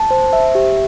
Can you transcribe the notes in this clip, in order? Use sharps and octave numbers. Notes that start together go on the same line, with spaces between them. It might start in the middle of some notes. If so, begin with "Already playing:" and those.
Already playing: A5
C5
E5
G4